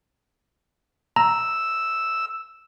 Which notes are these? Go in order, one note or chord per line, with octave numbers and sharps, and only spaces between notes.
A#5 E6